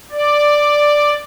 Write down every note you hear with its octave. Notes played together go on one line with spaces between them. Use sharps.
D5